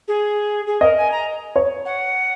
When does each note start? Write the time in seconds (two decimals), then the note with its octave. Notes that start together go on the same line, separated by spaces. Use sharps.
0.08 G#4
0.66 G#4
0.81 A#4 D#5
0.96 G#5
1.11 A#5
1.56 C#5
1.85 F#5